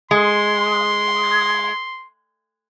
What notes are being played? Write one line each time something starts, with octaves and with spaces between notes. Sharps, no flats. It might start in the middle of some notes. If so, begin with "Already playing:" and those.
G#3 C6